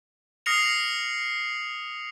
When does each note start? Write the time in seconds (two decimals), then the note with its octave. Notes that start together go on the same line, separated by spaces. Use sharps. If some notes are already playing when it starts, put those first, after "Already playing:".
0.46 D#6 F6 A#6 C7 C#7 F7